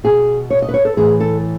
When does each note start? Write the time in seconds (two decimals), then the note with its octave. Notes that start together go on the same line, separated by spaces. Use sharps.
0.04 B2 G#4
0.50 C#5
0.62 D#5
0.69 B4
0.74 C#5
0.85 A4
0.97 A2 E3 G#4
1.20 A4